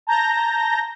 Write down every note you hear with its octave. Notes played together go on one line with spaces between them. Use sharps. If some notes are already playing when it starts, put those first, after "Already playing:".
A5 A#5 G6 A#6